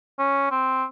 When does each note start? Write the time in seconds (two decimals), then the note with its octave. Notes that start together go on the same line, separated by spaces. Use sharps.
0.19 C#4
0.51 C4